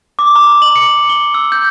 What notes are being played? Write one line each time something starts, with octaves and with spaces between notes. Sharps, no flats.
D6
A#5
F#7
C#7
G7
E6
G6